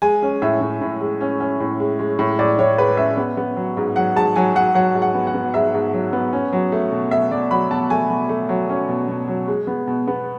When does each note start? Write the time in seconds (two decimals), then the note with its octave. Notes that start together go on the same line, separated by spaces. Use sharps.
0.02 G#3 G#5
0.22 C#4
0.42 A2 E5
0.61 A2
0.81 A2
1.01 G#3
1.21 C#4
1.40 C#4
1.60 A2
1.80 G#3
1.99 G#3
2.19 A2
2.39 A2 D5
2.59 A2 C#5
2.78 G#3 B4
2.97 C#4 E5
3.17 B3
3.37 B3
3.57 F#3
3.77 G#2
3.96 F#3 F#5
4.16 G#2 A5
4.36 F#3 G#5
4.55 F#3 F#5
4.74 F#3 F#5
4.95 G#2
5.02 F#5
5.14 B3
5.27 F#5
5.34 B3
5.54 G#2 E5
5.74 G#2
5.93 F#3
6.13 B3
6.33 C#4
6.53 F#3
6.72 A3
6.92 B2
7.11 B2 E5
7.31 B2 D5
7.51 F#3 B5
7.71 B2 A5
7.90 A3 G#5
8.10 B2
8.29 A3
8.49 F#3
8.69 C#4
8.89 B2
9.08 B2
9.28 F#3
9.48 G#3
9.67 B3
9.87 B2
10.07 B3